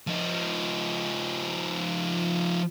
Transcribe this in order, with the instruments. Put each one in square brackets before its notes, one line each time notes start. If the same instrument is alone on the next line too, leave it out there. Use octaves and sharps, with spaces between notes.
[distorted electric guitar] F3 D#4